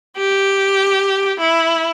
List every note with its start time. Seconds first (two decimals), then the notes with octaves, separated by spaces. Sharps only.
0.17 G4
1.40 E4